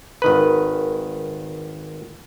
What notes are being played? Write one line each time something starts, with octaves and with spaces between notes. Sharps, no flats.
G#1 D#3 B4